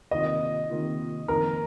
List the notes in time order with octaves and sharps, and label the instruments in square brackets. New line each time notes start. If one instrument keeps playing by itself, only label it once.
[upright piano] C3 D#3 A#3 F4 [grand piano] D#5
[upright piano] C3 D#3 A#3 F4
[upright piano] F2 D#3 A#3 [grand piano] A#4